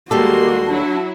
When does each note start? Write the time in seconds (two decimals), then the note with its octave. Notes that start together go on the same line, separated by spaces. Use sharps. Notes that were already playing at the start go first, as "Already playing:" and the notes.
0.11 D#2 G3 G#3 A#3 F#4 G4 A4 C6
0.67 F#3 D4 E4